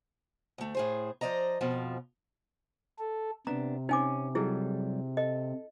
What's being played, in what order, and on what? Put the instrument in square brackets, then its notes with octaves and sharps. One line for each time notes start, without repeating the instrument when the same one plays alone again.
[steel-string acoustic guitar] D2 A3
A2 G#4 C5
F3 C5 D5 D#5 A#5
F2 B2 F3
[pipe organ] A4
[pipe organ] C3 [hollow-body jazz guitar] B3 D4 [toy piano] A#5
[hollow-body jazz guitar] C4 C#4 [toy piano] D#4 G#5 D6
[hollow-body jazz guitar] F#3 G3 A4 [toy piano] E4 G#4
[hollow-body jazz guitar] A4 [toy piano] D#5